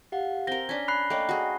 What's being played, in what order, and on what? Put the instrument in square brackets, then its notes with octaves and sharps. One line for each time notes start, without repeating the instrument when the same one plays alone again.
[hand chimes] G4 F5 F#5
[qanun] C4 A#4 [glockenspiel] A#6 G7
[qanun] C#4 D4 [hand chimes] G#6 B6
[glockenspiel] B5 F#6 C7
[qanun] A3 A#3 A#4 [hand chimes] C#5 D#5 G5
[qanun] F#4 G#4